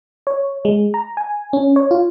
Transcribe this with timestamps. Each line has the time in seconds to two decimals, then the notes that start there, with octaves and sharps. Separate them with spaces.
0.27 C#5
0.65 G#3
0.94 A#5
1.17 G#5
1.53 C#4
1.76 C#5
1.91 F4